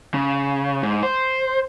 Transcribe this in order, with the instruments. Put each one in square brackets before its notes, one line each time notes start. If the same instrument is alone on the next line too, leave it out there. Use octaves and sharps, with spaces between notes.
[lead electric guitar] C#3
G#2
C5